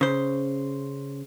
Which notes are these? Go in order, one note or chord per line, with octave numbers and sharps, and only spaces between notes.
C#3 C5